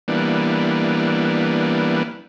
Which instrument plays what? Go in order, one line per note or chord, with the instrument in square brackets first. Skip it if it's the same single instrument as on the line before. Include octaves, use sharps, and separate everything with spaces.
[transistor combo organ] E3 G3 A#3 B3 D4